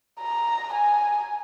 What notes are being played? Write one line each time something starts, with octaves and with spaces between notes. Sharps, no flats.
A#5
G#5